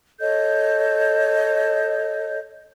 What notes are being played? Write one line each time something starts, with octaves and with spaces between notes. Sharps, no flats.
A4 C#5 D#5 G6